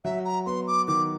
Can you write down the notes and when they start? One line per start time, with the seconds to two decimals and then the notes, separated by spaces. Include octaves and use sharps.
0.04 F#3 E5
0.25 A#5
0.46 B3 C6
0.67 D6
0.88 D#3 D6